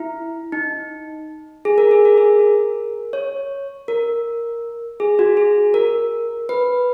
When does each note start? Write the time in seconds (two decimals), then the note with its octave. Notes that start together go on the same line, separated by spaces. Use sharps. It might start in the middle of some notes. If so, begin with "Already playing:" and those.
Already playing: E4
0.52 D#4
1.65 G#4
1.78 A#4
1.91 G#4
2.05 A#4
2.17 G#4
2.39 A#4
3.13 C#5
3.88 A#4
5.00 G#4
5.19 F#4
5.37 G#4
5.74 A#4
6.49 B4